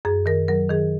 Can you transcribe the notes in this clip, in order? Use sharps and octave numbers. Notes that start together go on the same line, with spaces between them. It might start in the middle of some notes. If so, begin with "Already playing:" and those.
F#2 G#4
D#3 A#4
F#3 A#4
D#3 G#4